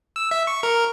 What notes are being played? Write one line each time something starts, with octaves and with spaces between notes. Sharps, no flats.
E6
E5
C#6
A#4